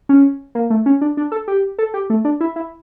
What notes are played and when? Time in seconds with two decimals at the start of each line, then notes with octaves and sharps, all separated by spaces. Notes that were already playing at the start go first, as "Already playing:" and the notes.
0.09 C#4
0.55 A#3
0.70 A3
0.86 C#4
1.01 D4
1.17 D4
1.32 A4
1.48 G4
1.79 A4
1.94 G4
2.10 A3
2.25 D4
2.41 E4
2.56 E4